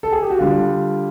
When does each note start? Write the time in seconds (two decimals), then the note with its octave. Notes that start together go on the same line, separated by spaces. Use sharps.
0.03 A4
0.12 G#4
0.22 G4
0.30 F#4
0.39 D3 G3 F4